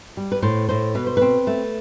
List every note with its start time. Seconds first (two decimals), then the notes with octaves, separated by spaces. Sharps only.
0.17 G3
0.32 B4
0.42 A2 C5
0.69 A2 C5
0.95 B2 B4
1.07 C5
1.17 C4 B4
1.47 A3